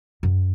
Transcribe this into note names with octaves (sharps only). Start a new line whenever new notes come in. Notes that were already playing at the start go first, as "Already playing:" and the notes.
F#2